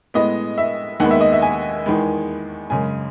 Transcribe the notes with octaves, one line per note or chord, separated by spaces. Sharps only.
A2 G#3 B3 D#5
E5
D#2 D#3 G#3 B3 F#5
E5
D#5
E5
G#5
E2 D#3 G#3 B3
F#2 C#3 G#3 G#5